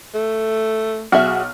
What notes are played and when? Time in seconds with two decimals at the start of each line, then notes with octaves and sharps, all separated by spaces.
0.15 A3
1.12 B1 F#4 G#4 E5 F#5 F6